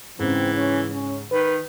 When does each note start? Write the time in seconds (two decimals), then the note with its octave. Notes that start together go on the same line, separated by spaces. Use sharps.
0.19 G#2 C#3 E3 C4
0.54 C#4
0.91 C#4
1.32 D#3 B4